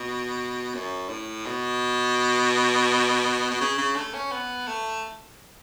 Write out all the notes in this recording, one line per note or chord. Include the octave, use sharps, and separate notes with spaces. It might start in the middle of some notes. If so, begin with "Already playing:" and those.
Already playing: B2
F#2
A2
B2
B2
C#3
C#3
A3
C#4
B3
A3